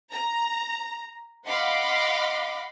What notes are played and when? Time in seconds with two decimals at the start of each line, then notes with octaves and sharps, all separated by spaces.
0.11 A#5
1.47 D#5 F5 F#5 B5 C6 D6